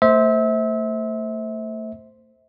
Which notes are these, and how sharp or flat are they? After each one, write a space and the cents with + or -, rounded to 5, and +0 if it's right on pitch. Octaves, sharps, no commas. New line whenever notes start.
A3 +35 C5 +0 E5 -30